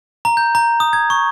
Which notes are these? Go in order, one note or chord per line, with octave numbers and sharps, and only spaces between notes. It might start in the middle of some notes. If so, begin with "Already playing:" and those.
A#5
G6
A#5
D#6
G#6
C#6